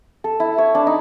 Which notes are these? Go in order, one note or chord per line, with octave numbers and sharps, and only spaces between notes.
A4
E4
C#5
D4
D#4